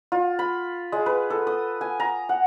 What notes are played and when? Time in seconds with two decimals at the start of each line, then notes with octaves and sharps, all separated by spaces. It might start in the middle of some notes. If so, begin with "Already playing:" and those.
0.12 F4
0.39 B5
0.92 G#3
1.06 B4
1.30 A4
1.47 D#6
1.81 G#5
2.00 A#5
2.29 F#5